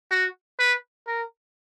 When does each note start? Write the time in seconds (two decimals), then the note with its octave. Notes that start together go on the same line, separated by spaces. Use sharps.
0.11 F#4
0.59 B4
1.07 A#4